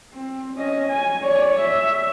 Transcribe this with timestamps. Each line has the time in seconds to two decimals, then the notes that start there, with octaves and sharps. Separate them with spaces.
0.13 C4
0.56 C#4 D#5
0.88 G#5
1.23 C#5 D5
1.60 E5